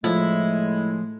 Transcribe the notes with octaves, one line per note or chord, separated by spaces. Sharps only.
A2 F3 G#3 E4